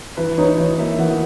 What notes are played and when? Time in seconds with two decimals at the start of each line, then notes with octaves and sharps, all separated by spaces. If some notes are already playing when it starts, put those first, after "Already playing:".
0.17 E3 B4
0.38 D#4 C#5
0.58 E3 C#5
0.79 A#3 E5
0.99 E3 F#5